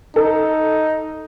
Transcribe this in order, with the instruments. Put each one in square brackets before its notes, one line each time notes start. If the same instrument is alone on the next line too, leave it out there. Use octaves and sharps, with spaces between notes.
[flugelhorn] D#4 [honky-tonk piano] A4